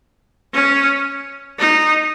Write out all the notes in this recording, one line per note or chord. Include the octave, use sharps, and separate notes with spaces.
C#4
D#4